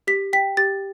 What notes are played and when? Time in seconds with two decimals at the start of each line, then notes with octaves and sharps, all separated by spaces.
0.07 G4 B6
0.33 G5 B6
0.57 G4 A6